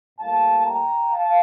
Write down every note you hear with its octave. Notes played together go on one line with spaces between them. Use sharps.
A2 G3 A#3 F5 A5
G5 A#5
F5 A5